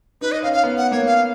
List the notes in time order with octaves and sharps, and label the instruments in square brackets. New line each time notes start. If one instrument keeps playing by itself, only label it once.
[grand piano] D#4 [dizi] B4
[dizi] D#5
[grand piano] C#4 [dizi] F5
[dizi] F5
[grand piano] B3
[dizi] F#5
[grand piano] A#3 [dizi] C#5
[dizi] F5